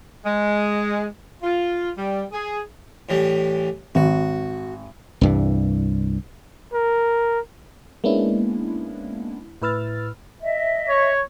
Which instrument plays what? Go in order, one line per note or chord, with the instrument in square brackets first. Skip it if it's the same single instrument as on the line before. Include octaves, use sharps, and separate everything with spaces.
[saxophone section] G#3
F4
G3
G#4
[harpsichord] A2 E3 G3
[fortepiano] G#1 [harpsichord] F#4
[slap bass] C2 G2 E3
[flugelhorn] A#4
[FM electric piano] G#3 A#3 B3 C#4 D4 E4
A2 E4 B4 E6 F6 A6
[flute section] D#5 E5
[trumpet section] C#5